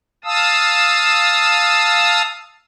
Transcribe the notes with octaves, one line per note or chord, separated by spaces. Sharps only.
F5 A5 D#6 E6